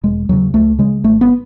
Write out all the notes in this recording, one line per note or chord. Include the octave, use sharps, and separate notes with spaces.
E1 G#3
D#2 C#3 F#3
C#2 A3
C#3 G#3
G#1 A3
B3